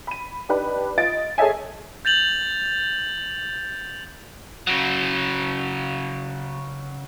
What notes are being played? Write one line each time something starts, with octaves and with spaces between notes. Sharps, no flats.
B5 D#7
D4 D#4 G4 B4
F4 D#5 A6 D7
G#4 A4 C#5 D#5 E5 G#5
G6 A6 F7 F#7
C#3 F#3